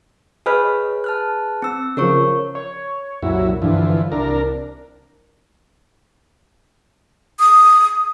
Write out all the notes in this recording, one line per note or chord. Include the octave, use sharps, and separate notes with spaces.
G#4 B4 C#5 D#5 F6
A5 F6 F#6
C4 E6
C#3 F3 A#4 C#5 C#6
C#5
C2 F#2 A#2 F#3 E4
G2 D3 E3 F3
C2 D4 A#4
D#6